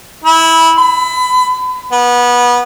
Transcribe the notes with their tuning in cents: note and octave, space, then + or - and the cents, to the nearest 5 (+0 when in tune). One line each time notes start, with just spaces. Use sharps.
E4 -15
B5 +30
B3 -20